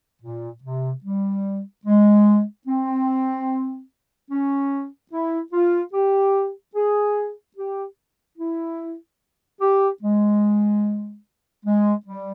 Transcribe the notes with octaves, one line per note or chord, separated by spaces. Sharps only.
A#2
C3
G3
G#3
C4
C#4
E4
F4
G4
G#4
G4
E4
G4
G#3
G#3
G3